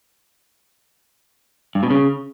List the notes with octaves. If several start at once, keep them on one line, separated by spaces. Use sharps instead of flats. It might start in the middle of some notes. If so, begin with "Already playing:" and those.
G2
B2
C#3